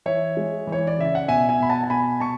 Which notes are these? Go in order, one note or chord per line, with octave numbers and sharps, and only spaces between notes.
E3 C#5 E5
G#3
E3
C#5
D5
C#3 E5
F#5
B2 E5 G#5
E5 G#5
B2 B5
F#5 A5
A5
B2 G#5 B5
B2 A5 C#6